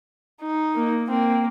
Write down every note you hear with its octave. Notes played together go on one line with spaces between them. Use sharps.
D#4
A#3
A#3 C4